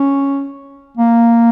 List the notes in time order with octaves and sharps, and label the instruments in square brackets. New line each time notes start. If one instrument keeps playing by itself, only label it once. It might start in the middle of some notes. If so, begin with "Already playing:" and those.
Already playing: [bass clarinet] C#4
A#3